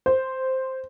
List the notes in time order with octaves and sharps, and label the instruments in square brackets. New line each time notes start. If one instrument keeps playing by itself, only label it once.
[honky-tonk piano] C5